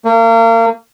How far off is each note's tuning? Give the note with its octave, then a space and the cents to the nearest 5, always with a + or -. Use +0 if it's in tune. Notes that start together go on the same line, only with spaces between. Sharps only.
A#3 -35